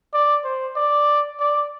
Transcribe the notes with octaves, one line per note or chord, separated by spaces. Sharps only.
D5
C5
D5
D5